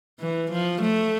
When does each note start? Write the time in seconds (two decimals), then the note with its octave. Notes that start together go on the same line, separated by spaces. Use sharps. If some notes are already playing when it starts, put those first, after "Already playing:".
0.20 E3
0.52 F3
0.82 A3